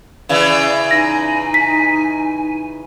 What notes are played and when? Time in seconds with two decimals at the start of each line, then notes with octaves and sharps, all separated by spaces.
0.29 C#3 E3 D5
0.91 D#4 G#5 A#6
1.54 B6